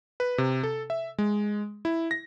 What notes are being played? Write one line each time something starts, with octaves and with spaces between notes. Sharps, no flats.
B4
C3
A4
E5
G#3
E4
A#6